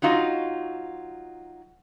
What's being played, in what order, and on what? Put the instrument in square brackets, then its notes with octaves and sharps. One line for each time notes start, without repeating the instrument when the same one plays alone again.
[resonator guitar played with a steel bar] F#3 D#4 F4 F#4 D#5